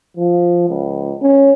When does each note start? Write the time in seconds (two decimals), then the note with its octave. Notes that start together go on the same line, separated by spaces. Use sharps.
0.17 F3
0.69 C#2
1.22 C#4